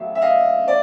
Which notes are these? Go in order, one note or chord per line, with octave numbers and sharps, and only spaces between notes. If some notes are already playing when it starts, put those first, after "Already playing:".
Already playing: A1 A2 F#3 E5 F5
E5
D#5 F5
D5